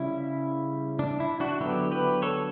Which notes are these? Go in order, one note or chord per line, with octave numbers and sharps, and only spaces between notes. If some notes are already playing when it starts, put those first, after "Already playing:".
Already playing: C#3 G3 C#4 E4
D4
E4
D4 F#4
D3 F#3 B3 E4 G4
G4 B4
A4 C#5